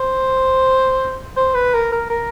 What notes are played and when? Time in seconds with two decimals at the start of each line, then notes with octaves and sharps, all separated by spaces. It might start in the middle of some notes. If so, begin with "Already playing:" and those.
Already playing: C5
1.37 C5
1.55 B4
1.74 A#4
1.92 A#4
2.10 A#4